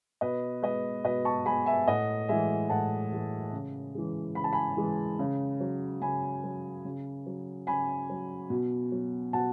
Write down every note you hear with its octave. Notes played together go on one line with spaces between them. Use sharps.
B2 B4 D#5
G#3 B4 D#5
B2 B4 D#5
A5 C#6
G#3 G#5 B5
E5 G#5
A2 D#5 F#5
E3 G#3 E5 G#5
A2 F#5 A5
E3 G#3
C#3
E3 G#3
C#3 B5
A5
G#5 B5
E3 G#3
C#3
F#3
C#3 G#5 B5
F#3
C#3
F#3
C#3 G#5 B5
F#3
B2
F#3
B2 F#5 A5